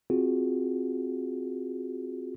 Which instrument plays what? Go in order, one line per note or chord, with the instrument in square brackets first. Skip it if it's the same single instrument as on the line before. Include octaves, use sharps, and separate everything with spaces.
[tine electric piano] C4 F4 F#4 G#4